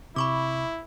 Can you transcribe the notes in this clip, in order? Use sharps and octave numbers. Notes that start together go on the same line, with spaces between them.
C3 E4 B5 C#6 D6